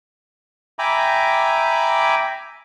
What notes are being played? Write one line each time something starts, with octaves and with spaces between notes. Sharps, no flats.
E5 G5 G#5 A#5 B5 D6